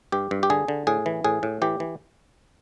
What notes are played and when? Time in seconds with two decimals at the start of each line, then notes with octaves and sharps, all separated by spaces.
0.12 G2 G4
0.31 G2
0.43 G4
0.50 D3 G#4
0.68 D3
0.87 A2 G#4
1.06 E3
1.24 A2 G#4
1.43 A2
1.62 E3 G4
1.80 E3